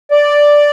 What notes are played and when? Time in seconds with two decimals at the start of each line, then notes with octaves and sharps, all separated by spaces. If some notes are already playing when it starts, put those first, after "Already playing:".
0.11 D5